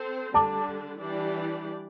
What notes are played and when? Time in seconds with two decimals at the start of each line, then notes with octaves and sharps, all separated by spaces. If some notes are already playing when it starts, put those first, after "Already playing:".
Already playing: C4 A4 C5
0.34 D3 G3 D4 A5 D6
1.00 E3 G3 D4 G4 D5